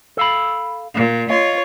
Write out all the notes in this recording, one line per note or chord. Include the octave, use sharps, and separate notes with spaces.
A4 F5 B5
A#2
F4 C#5 D#5